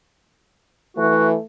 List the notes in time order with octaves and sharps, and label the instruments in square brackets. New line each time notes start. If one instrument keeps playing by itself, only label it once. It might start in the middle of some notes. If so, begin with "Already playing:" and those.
[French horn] E3 [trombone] A3 [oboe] F#4